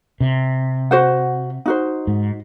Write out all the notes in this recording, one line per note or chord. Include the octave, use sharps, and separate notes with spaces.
C3
F#4 C5 F#5
D#4 F#4 C5
G#2